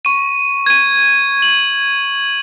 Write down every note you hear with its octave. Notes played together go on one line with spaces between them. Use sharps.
C#6 D#7
G#6 D#7
F#7